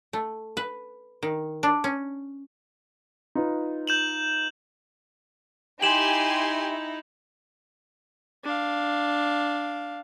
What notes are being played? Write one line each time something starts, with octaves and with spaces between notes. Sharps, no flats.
A3
B4
D#3
D4
C#4
D#4 F4 B4
G6 E7 F#7
D#4 E4 G4 G#5 C6 E7 F#7
D4 F5